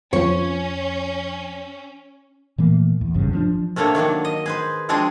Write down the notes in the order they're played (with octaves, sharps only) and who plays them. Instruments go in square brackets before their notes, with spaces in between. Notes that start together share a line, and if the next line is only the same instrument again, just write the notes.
[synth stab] F2 F3 [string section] C#4 [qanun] C#5
[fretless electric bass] A#2 E3 A3 A#3
E2
G#1 G2 C#3
F3 C4 D4
[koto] C3 A3 A#3 D4 C#5
D#3 F#3 A#3 D4
D#5
G#4 B4 C5
F3 G#3 C4 D4 F#4 G#4